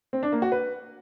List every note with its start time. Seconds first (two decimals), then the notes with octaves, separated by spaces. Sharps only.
0.13 C4
0.23 D4
0.32 A#3
0.42 F#4
0.52 B4